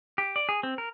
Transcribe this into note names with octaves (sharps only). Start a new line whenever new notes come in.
G4
D5
G#4
C4
A#4